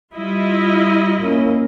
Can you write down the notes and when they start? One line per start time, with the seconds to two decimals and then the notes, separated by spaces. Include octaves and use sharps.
0.15 G3 E4 F4 D#5
1.20 A#3 C#4